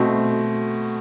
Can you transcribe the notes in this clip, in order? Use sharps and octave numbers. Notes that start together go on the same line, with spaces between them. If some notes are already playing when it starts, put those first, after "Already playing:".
Already playing: B2 A3 C4